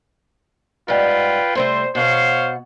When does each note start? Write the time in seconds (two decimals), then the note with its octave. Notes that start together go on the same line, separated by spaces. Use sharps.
0.88 G#2 G3 F4 B4 G5
1.55 C3 G3 A3 C5
1.95 B2 C5 C#5 F5 F#5